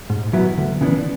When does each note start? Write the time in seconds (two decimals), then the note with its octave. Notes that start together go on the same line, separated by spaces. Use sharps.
0.10 G#2
0.33 F#3 B3 E4
0.58 D2
0.81 C#3 E3 B3 D4